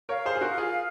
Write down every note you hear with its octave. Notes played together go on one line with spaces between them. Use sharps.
A#4 C#5 F5
G#4 C5
G#4
F#4 A#4
F4 G#4